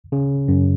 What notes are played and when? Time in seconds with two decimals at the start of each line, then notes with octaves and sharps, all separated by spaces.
0.12 C#3
0.48 F#2